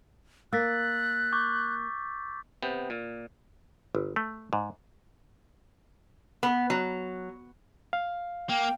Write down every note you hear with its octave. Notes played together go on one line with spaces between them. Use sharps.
A#3 E6 F#6 A6 B6
C#6 D6 G6
C3 B3 G5
A#2
G1
A3
G#2
B3
F#3
F5
A#3 G5